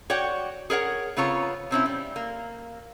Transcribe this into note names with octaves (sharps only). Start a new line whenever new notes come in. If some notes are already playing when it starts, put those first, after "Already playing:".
F#4 C#5 D5 F#5 G5
G#4 A#4 C#5 F#5
C#3 B3 C4 F4 C#5 A#5
C3 C4 C#4 E4
G3
A#3